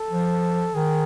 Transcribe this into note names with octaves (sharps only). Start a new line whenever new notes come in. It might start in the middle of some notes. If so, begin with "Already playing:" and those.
Already playing: A4
F3
D#3 G#4